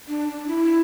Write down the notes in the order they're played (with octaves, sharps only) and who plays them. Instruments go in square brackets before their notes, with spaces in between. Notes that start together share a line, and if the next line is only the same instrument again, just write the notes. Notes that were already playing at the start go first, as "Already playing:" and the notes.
[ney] D4
D4
E4